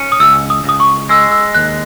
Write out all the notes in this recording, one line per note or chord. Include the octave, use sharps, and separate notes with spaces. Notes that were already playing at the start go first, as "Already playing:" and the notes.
Already playing: C#4
D#6
C#2 E6
D#6
C#2 D#6
C#6
G#3 E6
E6
D#2 F#6